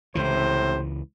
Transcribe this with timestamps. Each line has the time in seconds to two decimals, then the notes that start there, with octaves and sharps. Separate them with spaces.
0.15 C#2 A2 C3 E3 C5